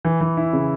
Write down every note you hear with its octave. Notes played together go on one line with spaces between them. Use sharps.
E3
E3
E4
C#3